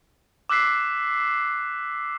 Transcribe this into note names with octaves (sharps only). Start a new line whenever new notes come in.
D6 E6 F#6 B6 C7